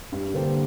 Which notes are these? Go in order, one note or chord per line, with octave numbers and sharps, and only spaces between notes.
G2
D3 A#3 G4 C5